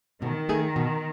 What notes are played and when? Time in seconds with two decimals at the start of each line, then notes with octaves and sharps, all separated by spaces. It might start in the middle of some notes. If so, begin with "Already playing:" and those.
0.22 B2 D#3
0.49 A3 D#4 G#4
0.76 B2